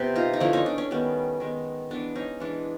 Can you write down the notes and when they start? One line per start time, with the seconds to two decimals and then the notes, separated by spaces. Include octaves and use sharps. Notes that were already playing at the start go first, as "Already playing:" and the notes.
Already playing: C3 B3 G4
0.15 D#4 F4
0.33 D#4
0.40 D3 F3 A3 D4 E4
0.53 C#4 D#4
0.66 D4
0.78 C#4
0.91 D#3 G3 B3
1.40 D#3 G#3 B3
1.91 E3 G#3 B3 D4
2.15 C#4 D#4
2.40 E3 G#3 B3 D4